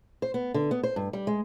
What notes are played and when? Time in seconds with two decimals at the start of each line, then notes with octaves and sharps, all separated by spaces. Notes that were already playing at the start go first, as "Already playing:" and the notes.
0.22 C5
0.34 B3
0.54 D3
0.71 B3
0.83 C5
0.96 G2
1.13 G3
1.27 G#3